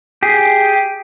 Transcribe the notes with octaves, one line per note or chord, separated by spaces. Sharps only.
G4 G#4